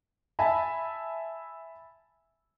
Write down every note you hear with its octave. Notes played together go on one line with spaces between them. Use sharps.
E5 G#5 A5 B5